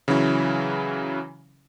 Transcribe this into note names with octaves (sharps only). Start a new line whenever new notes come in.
C#3 E3 F#3 C#4 E4